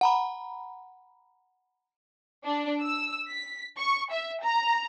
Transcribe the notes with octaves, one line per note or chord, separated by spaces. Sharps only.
F#5 A#5 B5
D4
E6
B6
C#6
E5
A#5